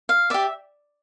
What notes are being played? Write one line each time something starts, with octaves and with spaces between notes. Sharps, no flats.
F5
G4 D5 E5